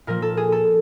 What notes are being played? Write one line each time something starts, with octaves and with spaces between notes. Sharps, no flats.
A#2 F3 A#3 A#4
A4
G#4
A4